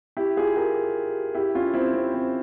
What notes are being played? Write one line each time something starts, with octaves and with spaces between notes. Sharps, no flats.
E4 G4
F4 G#4
G4 A#4
E4 G4
C#4 F4
C4 E4
C4
C4